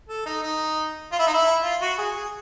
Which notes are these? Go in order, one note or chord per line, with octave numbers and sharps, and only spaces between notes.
A4
D#4
D#4
F4
E4
D#4
E4
F4
F#4
G#4
G#4